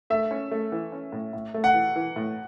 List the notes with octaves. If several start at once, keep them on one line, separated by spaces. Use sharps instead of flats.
A3 E5
C#4
A3
E3
C#4
A2
A2
A3
F#5
E3
E3
A2